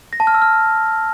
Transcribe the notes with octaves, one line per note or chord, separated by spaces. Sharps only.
A#6
A5
F6
E6
F6